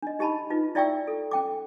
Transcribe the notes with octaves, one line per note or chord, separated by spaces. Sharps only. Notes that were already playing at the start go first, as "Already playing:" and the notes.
D4 D#5
D#4 G4 D#5 A5 B5
D#4 F4 B4
E4 D5 E5 G5 C#6 E6
A4
C#4 G5 D6